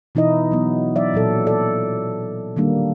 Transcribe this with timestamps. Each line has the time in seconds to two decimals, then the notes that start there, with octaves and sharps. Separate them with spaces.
0.15 B2 E3 D#4 E4 D#5
0.52 F#3 B3
0.95 F#3 D5 E5
1.14 A#2 F#3 A4
1.47 A4 D5
2.56 D#3 G3 A#3 D4